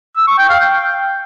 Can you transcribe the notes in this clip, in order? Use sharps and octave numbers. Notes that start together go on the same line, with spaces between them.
E6
C#6
G5
F5
G5